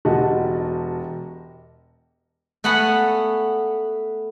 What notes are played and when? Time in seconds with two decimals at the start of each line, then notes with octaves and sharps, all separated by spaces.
0.05 E1 F#4 G4 D#5 A5
2.64 A3 B3 F#5 G#5 B5